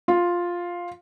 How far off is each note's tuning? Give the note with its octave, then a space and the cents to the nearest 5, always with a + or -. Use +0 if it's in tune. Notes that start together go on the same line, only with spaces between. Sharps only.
F4 +5